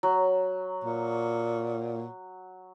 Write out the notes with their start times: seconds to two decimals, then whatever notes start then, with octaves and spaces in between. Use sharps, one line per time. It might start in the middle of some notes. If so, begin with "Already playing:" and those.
0.03 F#3
0.84 A#2